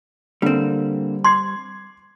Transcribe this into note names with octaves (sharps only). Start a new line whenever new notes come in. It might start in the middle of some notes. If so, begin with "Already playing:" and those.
D3 G3 A#3 C4
C6 D6 G#6 C7